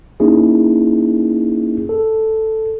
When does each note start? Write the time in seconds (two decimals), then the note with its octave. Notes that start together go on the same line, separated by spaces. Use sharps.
0.20 A#3 C#4 D#4 E4 G#4
1.89 A4